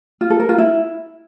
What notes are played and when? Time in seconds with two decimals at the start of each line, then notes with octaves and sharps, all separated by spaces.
0.21 F4
0.30 A4
0.40 A#4
0.49 F4
0.58 E4